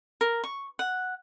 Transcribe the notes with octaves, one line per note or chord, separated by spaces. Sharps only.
A#4
C#6
F#5